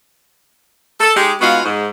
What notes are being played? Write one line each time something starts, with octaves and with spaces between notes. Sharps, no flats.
A4
G#3 D#4 G4
G#3 B3 D#4 F4 F#4 F5
G#2